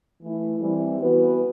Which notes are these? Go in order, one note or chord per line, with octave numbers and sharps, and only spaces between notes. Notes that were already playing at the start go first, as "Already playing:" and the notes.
E3 A3 E4
E3 G3 C4 E4
E3 B3 F#4 B4